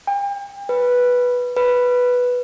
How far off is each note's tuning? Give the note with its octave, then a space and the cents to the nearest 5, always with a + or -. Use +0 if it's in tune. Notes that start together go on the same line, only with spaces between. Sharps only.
G5 +40
B4 -5
B4 +0